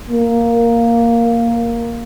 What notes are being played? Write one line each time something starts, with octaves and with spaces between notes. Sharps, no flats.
A#3